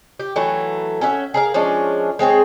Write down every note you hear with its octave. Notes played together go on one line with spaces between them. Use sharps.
G4
E3 F#3 A3
C#4 F#4 E5
G#4 A#4 F5
F3 G#3 C#4 D4
G#3 C4 G#4 C#5